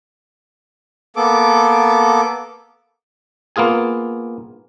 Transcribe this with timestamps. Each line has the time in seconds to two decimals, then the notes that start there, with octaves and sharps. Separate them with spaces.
1.16 A#3 B3 A4 D6
3.56 A#3 B3 F4 G#4 G#5